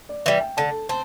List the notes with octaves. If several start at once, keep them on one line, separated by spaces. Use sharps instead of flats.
D5
E3 G3 E5
G5
D3 A5
C4 A5